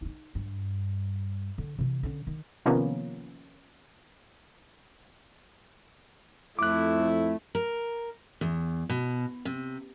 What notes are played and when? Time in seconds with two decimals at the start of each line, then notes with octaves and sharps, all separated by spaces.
0.01 D#4 E4
0.35 G2
1.58 D3
1.79 C3 E3
2.03 D3 C#4
2.27 D#3
2.66 C3 D#3 F3 A#3 B3 C#4
6.59 F2 A3 E4 D6 F#6
7.55 A#4
8.41 E2
8.90 B2
9.45 C3